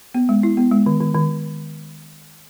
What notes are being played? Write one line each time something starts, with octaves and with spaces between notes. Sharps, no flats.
B3
G#3
E4
B3
G#3
D#3
D#3
D#3